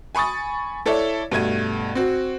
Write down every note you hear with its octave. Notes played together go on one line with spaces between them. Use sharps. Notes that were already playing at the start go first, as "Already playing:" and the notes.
G#5 B5 C#6 D#6 A6
E4 A4 C#5 D5 E5
G2 B2 A3 G#6 D#7
C4 F#4